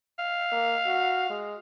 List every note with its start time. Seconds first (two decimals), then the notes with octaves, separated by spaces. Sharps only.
0.19 F5
0.52 A#3
0.86 F#4
1.30 G#3